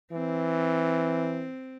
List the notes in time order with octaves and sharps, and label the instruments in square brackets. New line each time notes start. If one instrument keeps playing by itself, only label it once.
[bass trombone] E3 [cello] C4